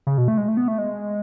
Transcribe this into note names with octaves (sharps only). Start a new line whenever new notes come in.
C#3
B2
A3
G#3
A3
B3
A3
G#3